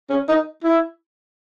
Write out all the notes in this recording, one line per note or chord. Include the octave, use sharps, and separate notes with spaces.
C#4
D#4
E4